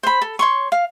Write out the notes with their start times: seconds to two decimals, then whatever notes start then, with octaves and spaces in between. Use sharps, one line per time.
0.03 C5 B5
0.22 A4
0.39 C#5 C6 C#6
0.72 F5